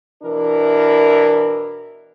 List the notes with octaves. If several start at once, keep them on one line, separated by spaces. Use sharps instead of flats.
B2 E3 D4 E4 A#4